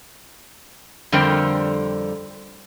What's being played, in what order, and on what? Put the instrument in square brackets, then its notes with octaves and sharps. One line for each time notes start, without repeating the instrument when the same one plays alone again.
[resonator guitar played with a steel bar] F2 D3 G3 A#4 C5 G5